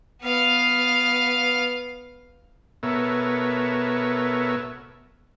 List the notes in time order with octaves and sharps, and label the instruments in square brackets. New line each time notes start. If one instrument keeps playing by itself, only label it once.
[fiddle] B3 F5
[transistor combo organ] B2 B3 A4 A#4 C#5 E5